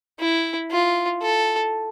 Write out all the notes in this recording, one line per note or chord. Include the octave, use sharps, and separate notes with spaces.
E4
F4
A4